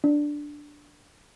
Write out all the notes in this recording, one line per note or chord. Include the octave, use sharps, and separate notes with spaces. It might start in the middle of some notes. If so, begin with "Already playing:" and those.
D4